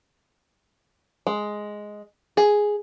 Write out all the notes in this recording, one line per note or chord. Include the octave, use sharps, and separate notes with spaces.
G#3
G#4